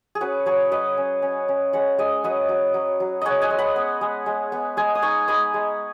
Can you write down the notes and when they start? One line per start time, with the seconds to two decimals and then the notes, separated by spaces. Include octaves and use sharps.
0.15 G#4
0.21 C#4 F#4 B4
0.46 F#3 G#4 C#5
0.72 F#3 B4 D#5
0.97 C#4
1.22 C#4
1.48 C#4
1.73 G#3 C#5 F#5
1.98 G#3 D#5 G#5
2.24 F#3 B4 D#5
2.49 F#3
2.74 F#3
3.00 F#3
3.21 G#3 C#5 D#5 F#5
3.42 D#5 G#5
3.50 G#3
3.58 F#5 B5
3.76 B3
4.01 G#3
4.26 G#3
4.52 B3
4.77 G#3 D#5 G#5
4.95 D#6
5.02 D#4 G#5 C#6
5.28 G#3 B5 D#6
5.54 G#3